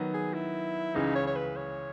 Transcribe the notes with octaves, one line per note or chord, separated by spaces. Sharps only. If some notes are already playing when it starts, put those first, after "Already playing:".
Already playing: D#3 F#3 B3
G#4
E4
C#2 C#3 E3 D#4
C#5
C#5
B4
C#5